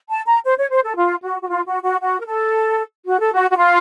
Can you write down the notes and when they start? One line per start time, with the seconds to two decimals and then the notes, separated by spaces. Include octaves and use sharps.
0.09 A5
0.26 A#5
0.45 C5
0.57 C#5
0.70 C5
0.83 A4
0.97 F4
1.23 F#4
1.41 F#4
1.49 F4
1.66 F#4
1.84 F#4
2.01 F#4
2.20 A#4
2.27 A4
3.06 F#4
3.20 A4
3.33 F#4
3.50 F#4
3.58 F4